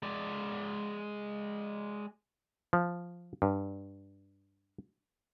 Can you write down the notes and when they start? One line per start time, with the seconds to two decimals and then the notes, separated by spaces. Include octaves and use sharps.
0.03 G#3 D5
2.73 F3
3.42 G2